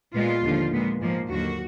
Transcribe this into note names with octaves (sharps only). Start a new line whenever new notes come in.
A#2 G#3 B3 F4
D#2 D3 F3
A#2 G#3 B3
G#2 F3 A#3
D#2 D3 F#3 A#3 F#4